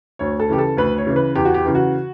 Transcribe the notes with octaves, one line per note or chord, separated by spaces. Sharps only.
D2 C#5
A4
C#3 E3 G4
A4
D2 B4
C#5
C#3 E3
B4
E2 G4
F#4
G4
C#3 E3
F#4